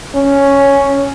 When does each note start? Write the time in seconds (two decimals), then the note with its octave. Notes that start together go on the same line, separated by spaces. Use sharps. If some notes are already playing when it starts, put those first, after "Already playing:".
0.15 C#4